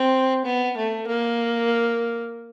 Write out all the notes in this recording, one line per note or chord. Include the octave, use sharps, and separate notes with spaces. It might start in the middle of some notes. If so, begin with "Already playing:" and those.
Already playing: C4
B3
A3
A#3